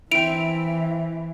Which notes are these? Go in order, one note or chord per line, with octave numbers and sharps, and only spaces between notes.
E3 C4 E4 E5 D7 F7